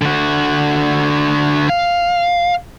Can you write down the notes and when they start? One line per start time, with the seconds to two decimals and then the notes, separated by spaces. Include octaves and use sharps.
0.02 D3 F#4
1.69 F5